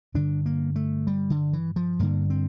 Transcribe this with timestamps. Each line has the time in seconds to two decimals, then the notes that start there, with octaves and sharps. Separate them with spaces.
0.14 G2 D3 D4
0.46 A#3
0.76 A3
1.07 G3
1.30 D3
1.53 E3
1.76 F3
1.99 G2 D3 A#3
2.30 C4